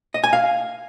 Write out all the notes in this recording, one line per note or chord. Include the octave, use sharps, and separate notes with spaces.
D#5
G#5
F5